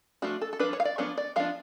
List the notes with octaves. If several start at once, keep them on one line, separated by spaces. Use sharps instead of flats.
F3 A3 D4 F#4
A4
A4
F3 A3 D4 B4
C#5
F5
D5
F3 B3 D4 C#5
D5
F3 B3 D4 F5